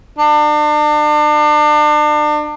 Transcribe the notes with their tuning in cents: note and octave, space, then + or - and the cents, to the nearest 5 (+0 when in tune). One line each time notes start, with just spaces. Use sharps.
D4 +35